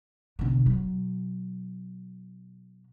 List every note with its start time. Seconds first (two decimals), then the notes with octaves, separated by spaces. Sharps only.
0.39 B2 D3
0.66 B2 F#3